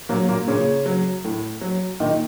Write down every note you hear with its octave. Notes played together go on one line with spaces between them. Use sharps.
A#2 F#3 A#3
A#2 A#3
A#2 C#3 C#4
F#3
A2
F#3
A#2 D#3 D#4